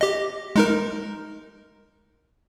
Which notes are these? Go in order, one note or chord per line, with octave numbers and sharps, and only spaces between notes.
G4 D#5
G#3 D#4 A#4